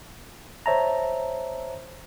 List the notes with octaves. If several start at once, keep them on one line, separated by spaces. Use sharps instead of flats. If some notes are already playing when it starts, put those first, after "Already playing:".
C5 C#5 E5 A5 A#5